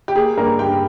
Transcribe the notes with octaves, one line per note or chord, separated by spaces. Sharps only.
G4
A#3 G#4
G2 A#3 A#4
G2 G4 G5